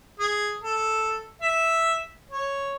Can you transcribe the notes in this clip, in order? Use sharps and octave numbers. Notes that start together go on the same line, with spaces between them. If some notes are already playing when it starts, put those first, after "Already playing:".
G#4
A4
E5
C#5